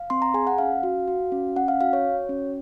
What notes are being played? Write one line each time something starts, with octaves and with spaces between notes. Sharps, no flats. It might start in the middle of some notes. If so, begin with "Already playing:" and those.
Already playing: F5
C4 C6
A#5
G#4 G#5
F#5
C#4 F5
F#4
F#4
C#4
C#4 F#5
F5
F#4 F5
C#5
F#4
C#4